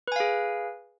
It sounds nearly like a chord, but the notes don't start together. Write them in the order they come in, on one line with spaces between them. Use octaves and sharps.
B4 G#5 F5 G#4